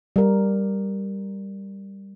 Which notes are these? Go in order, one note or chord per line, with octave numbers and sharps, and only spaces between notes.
G3 A#4